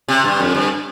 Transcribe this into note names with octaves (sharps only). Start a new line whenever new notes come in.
C3
G2
F2
G2